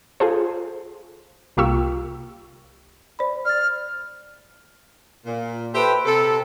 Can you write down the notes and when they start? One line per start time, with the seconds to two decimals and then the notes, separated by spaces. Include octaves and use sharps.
0.20 F4 G#4 A4 C5
1.57 C2 A#3 F4 G4 C#6 E6
3.19 C5 D5 B5
3.45 D5 F6 A6
5.26 A#2
5.73 G4 A4 B4 C5 E5 G5
6.06 C3 A4